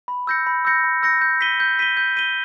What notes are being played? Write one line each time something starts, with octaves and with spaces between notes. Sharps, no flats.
B5
E6 G6 A#6 C#7
B5
E6 G6 A#6 C#7
B5
E6 G6 A#6 C#7
G6
B6 D#7 G7
G6
B6 D#7 G7
G6
B6 D#7 G7